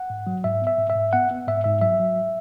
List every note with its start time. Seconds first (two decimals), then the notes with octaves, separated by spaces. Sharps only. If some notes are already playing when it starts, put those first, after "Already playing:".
Already playing: F#5
0.10 G#2
0.27 F#3
0.44 G#2 E5
0.62 B3
0.67 E5
0.78 G#2
0.90 E5
0.95 G#2
1.13 B3 F#5
1.31 B3
1.47 G#2 E5
1.64 G#2 E5
1.81 F#3 E5
2.00 F#3